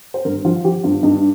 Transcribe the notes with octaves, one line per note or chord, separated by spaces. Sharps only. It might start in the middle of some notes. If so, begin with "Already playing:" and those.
C5
G2 A#4
F3 F4
F3 G4
G2 F4
G2 D#4